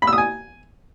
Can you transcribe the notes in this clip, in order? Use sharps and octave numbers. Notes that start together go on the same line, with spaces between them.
B5
E6
D#6
G#5